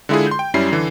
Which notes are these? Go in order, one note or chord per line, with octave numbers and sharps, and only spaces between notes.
D3 G#3 E4 F4 G#4
C6 G6
G5
F#2 G3 C#4 E4 C7
D3 E3